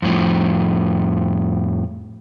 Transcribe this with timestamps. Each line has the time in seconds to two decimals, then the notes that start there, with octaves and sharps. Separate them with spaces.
0.02 F2 A2 F3